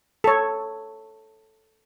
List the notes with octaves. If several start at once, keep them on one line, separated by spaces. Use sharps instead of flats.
A4 C#5